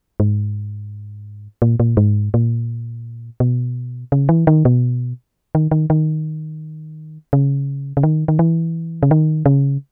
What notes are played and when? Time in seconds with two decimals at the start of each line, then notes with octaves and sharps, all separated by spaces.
0.20 G#2
1.62 A#2
1.80 A#2
1.97 G#2
2.34 A#2
3.40 B2
4.12 C#3
4.29 E3
4.47 D#3
4.65 B2
5.55 D#3
5.71 D#3
5.90 D#3
7.33 C#3
7.97 C#3
8.03 D#3
8.28 D#3
8.39 E3
9.03 C#3
9.11 D#3
9.46 C#3